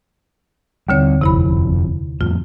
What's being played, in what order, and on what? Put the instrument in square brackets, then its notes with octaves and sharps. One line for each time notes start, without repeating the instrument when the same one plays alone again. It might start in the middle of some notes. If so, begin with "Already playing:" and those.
[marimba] D#2 D3 C#5 [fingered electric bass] G3 C4
[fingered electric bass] F#1 F2 [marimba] C3 E4 B5
[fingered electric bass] F2 A2 [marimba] F4